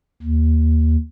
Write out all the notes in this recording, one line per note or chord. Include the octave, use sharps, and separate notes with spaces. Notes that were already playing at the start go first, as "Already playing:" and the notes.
D#2